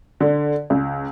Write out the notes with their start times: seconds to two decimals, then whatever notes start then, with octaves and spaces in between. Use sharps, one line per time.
0.21 D3
0.70 C#2